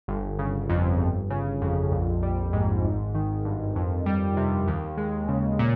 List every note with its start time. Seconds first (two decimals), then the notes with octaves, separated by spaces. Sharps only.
0.08 G1
0.39 C#3
0.69 F2
1.00 G1
1.30 C#3
1.62 F2
1.92 A#1
2.23 G3
2.53 G#2
2.84 G#1
3.15 D#3
3.45 G2
3.76 F2
4.06 G3
4.37 C3
4.67 D#2
4.98 G#3
5.28 C#3
5.59 A#2